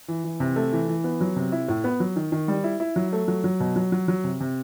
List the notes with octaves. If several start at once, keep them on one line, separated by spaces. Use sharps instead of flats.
E3
E3
C3
A3
E3
E3
B3
F#3
C3
E4
A2
B3
F#3
D#3
D#3
G3
E4
E4
F#3
A3
F#3
F#3
B2
F#3
F#3
F#3
C3
C3